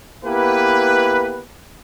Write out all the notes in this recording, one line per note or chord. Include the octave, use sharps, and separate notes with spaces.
A#3 B3 E4 G4 B4